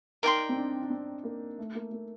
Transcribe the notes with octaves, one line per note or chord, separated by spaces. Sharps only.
D#4 A#4 D5 G5 C6
C4
D4
D4
C4
A#3
A3
A#3
A#3